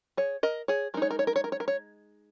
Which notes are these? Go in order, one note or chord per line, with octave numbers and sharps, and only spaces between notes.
G#4 C#5
A#4 D#5
G#4 C#5
G#3 D#4 A#4 C#5
A#4
C#5
A#4
C#5
A#4
C#5
A#4
C#5